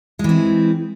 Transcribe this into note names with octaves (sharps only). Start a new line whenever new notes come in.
E3 G#3 C4